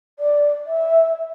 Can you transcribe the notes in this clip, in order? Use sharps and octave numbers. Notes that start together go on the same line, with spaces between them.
D5
E5